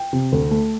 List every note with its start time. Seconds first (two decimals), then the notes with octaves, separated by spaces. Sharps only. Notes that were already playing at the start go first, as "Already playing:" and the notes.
Already playing: G5
0.13 C3
0.32 D2
0.51 A3